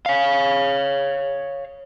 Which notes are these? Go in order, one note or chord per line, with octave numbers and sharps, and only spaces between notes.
C#5 F5